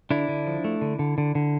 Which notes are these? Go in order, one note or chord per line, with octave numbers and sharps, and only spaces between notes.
D3 D4 E4
D3
F3
A3
D3
D3
D3
D3